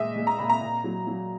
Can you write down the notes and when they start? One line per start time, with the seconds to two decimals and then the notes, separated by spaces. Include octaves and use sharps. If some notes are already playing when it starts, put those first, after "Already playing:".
Already playing: A#2 G#3 D#5 E5
0.16 G#3
0.27 A#5
0.39 A#2 B5
0.50 A#5
0.61 A#2
0.84 F#3
1.07 F#3